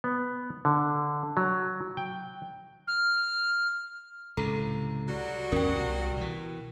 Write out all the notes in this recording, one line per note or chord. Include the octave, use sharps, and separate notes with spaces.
B3
D3
F#3
G5
F6
C#2 A2 C3 A4 A#5
F#3 G3 F#4
G#1 E2 C#4 A#4 G5
C2 B2
B2 E3